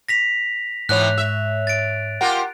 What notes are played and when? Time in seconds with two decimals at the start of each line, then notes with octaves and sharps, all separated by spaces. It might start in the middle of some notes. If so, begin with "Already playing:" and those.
0.09 A#6 B6 F7
0.89 G#2 C3 E3 B3 C#5 F#6 F7
1.18 E5
1.67 A6 D7
2.21 F4 G4 A#4 F#5